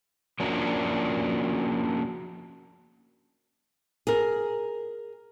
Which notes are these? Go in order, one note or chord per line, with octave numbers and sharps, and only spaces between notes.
F3 A#3 C#4 D4 F#4 A#4
G#4 A#4